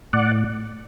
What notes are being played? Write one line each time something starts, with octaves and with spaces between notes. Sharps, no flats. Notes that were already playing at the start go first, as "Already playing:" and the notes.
A2 D5 F#5